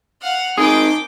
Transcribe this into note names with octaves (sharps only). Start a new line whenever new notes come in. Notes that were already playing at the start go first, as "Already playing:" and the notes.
F5 F#5
C4 D#4 G#4 A#4 G5 D6